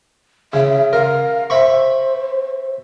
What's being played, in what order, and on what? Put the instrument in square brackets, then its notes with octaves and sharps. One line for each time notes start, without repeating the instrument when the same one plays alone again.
[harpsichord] C#3 [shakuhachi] E5
[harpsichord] A#4 [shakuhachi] F5
[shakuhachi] C5 [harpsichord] E5 B5 C#6